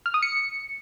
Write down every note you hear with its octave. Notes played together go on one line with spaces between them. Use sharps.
F6
D#6
C#7